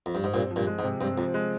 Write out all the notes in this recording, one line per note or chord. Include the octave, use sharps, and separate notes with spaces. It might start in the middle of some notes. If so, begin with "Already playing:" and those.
F2
G2
G#2
G2 A#2 C4
F3
G2 A#2
G#3
G#2
C3
G2 C4
F2 F3
G#3